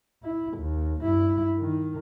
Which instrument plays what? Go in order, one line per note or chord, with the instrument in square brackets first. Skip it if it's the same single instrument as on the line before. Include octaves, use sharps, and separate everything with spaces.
[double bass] E4
D#2
G2 E4
D#3